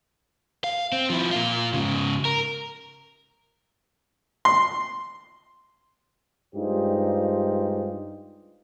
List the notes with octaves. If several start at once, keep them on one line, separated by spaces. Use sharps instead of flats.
F5
C4
F3 E4
A#2 F4
G#2 C#3
A#4
C6
G2 G#3 D#4 F4 G4 C5